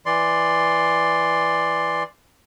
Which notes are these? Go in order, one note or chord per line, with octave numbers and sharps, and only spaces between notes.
E3 D5 C6